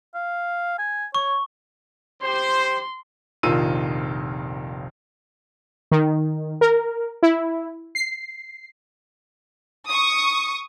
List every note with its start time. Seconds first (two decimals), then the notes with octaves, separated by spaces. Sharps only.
0.15 F5
0.79 G#5
1.15 C#5 C#6
2.23 G4 C5 C6
3.43 F1 A#1 D#3 F4 E6 D#7
5.91 D#3
6.61 A#4
7.23 E4
7.95 C7
9.88 C#6 D#6